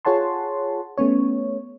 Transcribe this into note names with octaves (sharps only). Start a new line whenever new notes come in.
F4 G#4 C#5 F#5 A5 C6
A3 B3 C#4 C#5